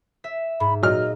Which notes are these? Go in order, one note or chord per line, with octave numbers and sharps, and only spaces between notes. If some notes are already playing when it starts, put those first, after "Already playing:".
E5
G#2 B5
A#2 F#3 D#5 F6